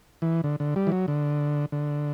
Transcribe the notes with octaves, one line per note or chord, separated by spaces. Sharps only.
E3
D3
D3
G3
E3
F#3
D3
D3